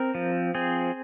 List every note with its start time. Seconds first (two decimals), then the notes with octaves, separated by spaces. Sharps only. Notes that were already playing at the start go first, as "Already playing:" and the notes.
Already playing: C4 A#4
0.15 F3
0.55 C4 G#4